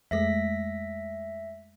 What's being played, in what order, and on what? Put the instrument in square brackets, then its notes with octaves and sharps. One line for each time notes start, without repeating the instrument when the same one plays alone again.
[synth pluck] F2 G#3 A3 [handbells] E5 A#6 B6